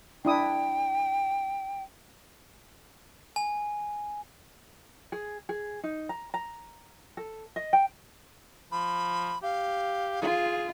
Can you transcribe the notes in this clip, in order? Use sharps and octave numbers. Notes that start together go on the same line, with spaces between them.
D4 E4 G5 D#6
G#5
G#4
G#4
D#4
A#5
A#5
A4
D#5
G5
F3 B5
G4 F5
F4 G#4